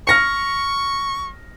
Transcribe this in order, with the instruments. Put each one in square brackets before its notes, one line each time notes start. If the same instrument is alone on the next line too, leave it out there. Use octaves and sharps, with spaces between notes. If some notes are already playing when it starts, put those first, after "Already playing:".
[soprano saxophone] C#6 [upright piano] F6 A#6 C#7